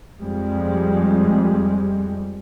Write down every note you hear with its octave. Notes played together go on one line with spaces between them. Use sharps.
F2 G3 G#3